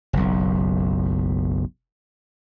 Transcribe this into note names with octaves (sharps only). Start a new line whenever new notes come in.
F#1 B1